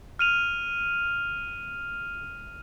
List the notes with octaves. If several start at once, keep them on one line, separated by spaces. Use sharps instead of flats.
F6 D#7 F7